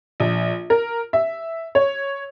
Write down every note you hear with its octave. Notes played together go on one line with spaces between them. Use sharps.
A#1
A#4
E5
C#5